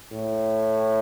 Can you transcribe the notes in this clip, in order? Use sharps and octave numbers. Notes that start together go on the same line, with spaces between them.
A2